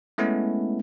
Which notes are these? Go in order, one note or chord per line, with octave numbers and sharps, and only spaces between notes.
G#3 A3 B3 C#4 E4